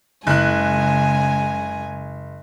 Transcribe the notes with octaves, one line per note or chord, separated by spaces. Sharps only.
F#1 C#3 G#3 G#5 F#6